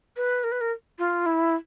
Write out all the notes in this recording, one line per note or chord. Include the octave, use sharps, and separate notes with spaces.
B4
A#4
B4
A#4
F4
E4